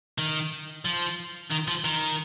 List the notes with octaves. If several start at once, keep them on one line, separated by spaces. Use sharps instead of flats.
D#3
F3
D#3
F3
D#3